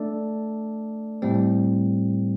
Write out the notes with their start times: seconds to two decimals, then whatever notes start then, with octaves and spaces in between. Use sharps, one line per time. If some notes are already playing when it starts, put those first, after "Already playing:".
Already playing: A3 D4 A4 D5
1.22 A2 G3 C4